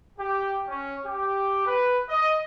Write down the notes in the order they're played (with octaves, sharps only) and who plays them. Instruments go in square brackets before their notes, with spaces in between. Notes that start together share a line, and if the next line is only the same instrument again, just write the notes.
[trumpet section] G4
C#4
G4
B4
D#5